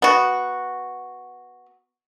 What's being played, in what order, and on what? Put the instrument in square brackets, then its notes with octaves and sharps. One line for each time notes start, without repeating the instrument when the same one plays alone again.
[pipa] B3 F#4